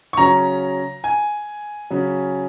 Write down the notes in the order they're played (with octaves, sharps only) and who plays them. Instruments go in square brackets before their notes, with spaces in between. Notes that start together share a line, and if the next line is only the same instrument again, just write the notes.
[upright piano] C#6
[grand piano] C#3 F#3 C#4 [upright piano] A#5
[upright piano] G#5
[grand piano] C#3 F#3 C#4